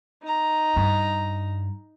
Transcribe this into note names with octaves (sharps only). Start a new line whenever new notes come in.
D#4 A#5
G2